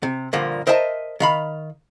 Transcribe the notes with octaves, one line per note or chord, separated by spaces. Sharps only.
C3
G2 A#2 D3 F3 A#3
A#4 C5 D#5 E5 G5 A5
D#3 F5 B5